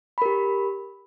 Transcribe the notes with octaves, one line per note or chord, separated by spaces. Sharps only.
G4 A#4 B5